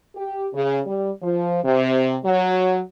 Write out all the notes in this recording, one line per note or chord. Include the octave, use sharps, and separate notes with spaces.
G4
C#3
G3
F3
C3
F#3